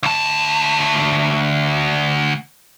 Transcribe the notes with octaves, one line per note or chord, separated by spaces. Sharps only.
D2 A5